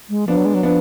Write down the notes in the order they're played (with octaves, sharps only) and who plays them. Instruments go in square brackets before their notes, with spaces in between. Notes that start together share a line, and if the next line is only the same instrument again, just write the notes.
[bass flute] G#3
[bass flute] F3 [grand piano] B3 D4
[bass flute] F#3
G#3
F#3
[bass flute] F3 [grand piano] B3 D4